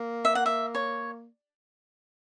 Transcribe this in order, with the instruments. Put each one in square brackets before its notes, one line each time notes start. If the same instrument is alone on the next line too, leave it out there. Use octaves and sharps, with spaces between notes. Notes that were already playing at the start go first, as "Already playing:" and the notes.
Already playing: [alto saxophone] A#3
[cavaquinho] E5
F#5
E5
C#5